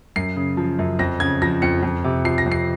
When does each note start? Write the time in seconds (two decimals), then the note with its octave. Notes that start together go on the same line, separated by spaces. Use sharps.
0.16 F#2 C7
0.36 C#3
0.57 F3
0.79 F#2
0.99 F2 A#6
1.20 C#3 G#6
1.42 F3 A#6
1.62 F2 C#7
1.83 F2
2.04 C3
2.25 F3 C7
2.38 A#6
2.46 F2
2.52 C7